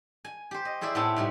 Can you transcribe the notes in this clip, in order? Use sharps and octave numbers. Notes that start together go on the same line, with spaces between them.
G#5
G4 C5
D#5
E4 G#4 C5 D5 E5
A2 B3 C4 E4 E5 A5
G#2 C3 G3